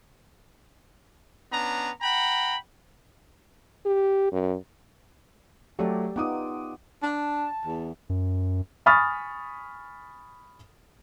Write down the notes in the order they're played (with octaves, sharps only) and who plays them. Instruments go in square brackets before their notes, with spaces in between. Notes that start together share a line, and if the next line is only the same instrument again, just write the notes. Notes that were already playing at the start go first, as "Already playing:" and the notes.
[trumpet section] B3 C#4 D4 A#5
F#5 G5 A#5 B5
[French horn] G4
F#2
[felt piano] F#3 A3 [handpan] G4 D5
[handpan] B3 D#4 F4 [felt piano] F#5 D6 D#6
[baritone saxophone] D4 [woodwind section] A5
[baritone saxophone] E2
[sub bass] F#2
[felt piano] G#5 B5 C#6 D#6 F6 A6